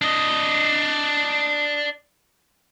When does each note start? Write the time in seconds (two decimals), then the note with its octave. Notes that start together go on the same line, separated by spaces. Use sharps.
0.02 D4 D#5